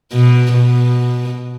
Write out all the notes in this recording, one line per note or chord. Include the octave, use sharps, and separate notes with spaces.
B2
B2